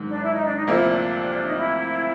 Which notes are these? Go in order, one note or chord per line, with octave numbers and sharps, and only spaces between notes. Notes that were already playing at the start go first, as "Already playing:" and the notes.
Already playing: G#2 D#3 F#3
D4
E4
D#4
D4
D#4
D2 C3 F3 A#3 E4
D4
D#4
E4